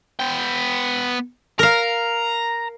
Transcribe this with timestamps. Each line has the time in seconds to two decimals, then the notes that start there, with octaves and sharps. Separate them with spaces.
0.20 B3 G5
1.59 A#4 F5 A#5